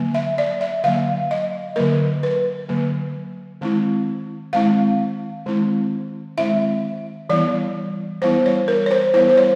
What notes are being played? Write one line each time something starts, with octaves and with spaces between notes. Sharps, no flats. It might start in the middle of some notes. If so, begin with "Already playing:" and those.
Already playing: D3 F#3 A#3
E5
D5
E5
D3 F#3 A#3 F5
D#5
D3 F#3 A#3 A#4
B4
D3 F#3 A#3
D#3 G#3 C4 E4
D#3 G#3 C4 E4 F5
D#3 G#3 C4 E4
D#3 G#3 C4 E4 E5
E3 G3 B3 E4 D5
E3 G3 B3 E4 C5
C#5
A#4
C#5
C5
E3 G3 B3 E4 C5
C5
C#5